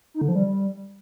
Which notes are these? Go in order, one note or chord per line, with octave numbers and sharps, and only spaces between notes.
D#4
D3
F3
G3